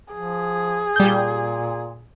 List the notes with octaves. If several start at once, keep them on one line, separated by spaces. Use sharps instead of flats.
F3 G#4
A#2 G3 G6